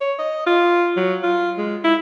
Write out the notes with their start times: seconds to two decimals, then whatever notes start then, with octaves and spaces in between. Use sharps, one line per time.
0.01 C#5
0.19 D#5
0.47 F4
0.96 F#3
1.23 F4
1.58 G#3
1.84 E4